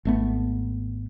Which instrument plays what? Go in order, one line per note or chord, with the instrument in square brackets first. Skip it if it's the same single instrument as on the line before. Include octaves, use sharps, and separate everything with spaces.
[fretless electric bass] G#1 A3 B3